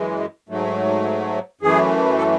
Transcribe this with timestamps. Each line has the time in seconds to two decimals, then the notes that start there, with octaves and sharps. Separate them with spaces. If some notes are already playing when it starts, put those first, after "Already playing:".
Already playing: F#2 E3 G#3
0.49 G#2 F#3 A3
1.61 F#2 E3 A3 G#4
2.18 A4